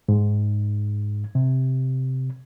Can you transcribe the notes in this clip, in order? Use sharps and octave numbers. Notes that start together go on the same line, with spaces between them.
G#2
C3